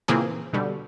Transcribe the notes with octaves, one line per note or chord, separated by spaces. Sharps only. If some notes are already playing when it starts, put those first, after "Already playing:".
A#2 C#3 E3 A#3 C4 G#4
B2 D3 G3